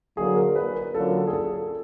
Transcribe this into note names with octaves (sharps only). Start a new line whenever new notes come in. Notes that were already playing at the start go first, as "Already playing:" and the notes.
D3 F#3 A#3 G#4
A#4
B4
A#4
D3 F#3 A#3 C#4 F4 A4
G#4
A4